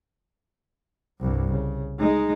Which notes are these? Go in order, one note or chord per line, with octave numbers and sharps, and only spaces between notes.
C2 G2
C#3
G#3 D#4